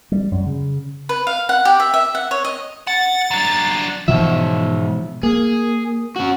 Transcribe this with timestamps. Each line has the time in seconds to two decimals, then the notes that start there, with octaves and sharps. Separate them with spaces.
0.12 G3
0.32 F#2
0.46 C#3
1.09 B4
1.27 F5
1.49 F#5
1.65 G4
1.80 E5
1.94 E5
2.15 F#5
2.31 C#5
2.45 D#5
2.87 F#5 A6
3.31 F#3 D4
4.08 G#2 B2 E3 F3 E5
5.23 A#3 G#4
6.16 C#4 F#4